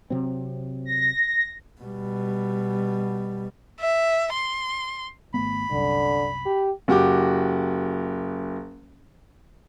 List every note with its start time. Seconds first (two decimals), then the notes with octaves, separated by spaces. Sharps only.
0.10 C3 F#3 C4
0.85 A#6
1.81 B2 G3
3.80 E5
4.34 C6
5.34 G#1 A3 B3 B5
5.71 C2 F#2 D3
6.46 G4
6.88 F#1 F#4 G4 D6